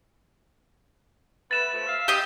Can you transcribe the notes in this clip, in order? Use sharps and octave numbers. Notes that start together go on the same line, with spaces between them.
A3 B3 B4 A6 E7
F3 A3
E5 F5
G4 D#5